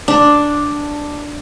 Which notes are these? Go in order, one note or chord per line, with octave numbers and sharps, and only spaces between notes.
D4